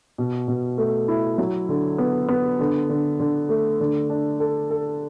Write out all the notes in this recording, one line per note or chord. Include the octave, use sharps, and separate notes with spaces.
B2
B2
A3
E4
F#3
D3
B3
B3
D3
D3
D3
A3
D3
D4
A4
A4